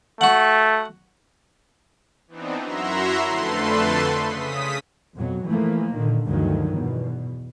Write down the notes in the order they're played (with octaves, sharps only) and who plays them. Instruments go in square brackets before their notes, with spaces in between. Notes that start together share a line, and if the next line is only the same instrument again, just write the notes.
[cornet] A3 [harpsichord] F#4 F#5
[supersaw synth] E3 B3 C4 D4 D#4
F#2 E4 F#4 E5 A#5 C6
F2 D3 A3 A4 B4 C6
C#3 D#6 B6
[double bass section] F2 B2 F#3
E3 F3 A3 A#3
A#2 D3 D#3
D2 G2 D3 D#3 F3 F#3
E2 B2